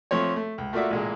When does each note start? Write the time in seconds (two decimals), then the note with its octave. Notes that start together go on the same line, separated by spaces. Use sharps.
0.11 F3 A3 C4 C#5
0.36 A3
0.58 C#2
0.73 A3 A#3 F4 F#4 D5 E5
0.91 A1 A#2 G#3